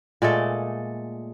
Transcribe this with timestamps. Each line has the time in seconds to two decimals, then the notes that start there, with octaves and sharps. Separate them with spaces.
0.22 A#2 G#3 A3 A4